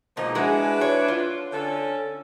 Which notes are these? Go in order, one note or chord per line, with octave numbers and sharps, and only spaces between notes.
B2 F3 G#3 A#3 D#4
G#3 D4 E4 F#4 G#4 B4
C#5
F4
D3 C#4 A4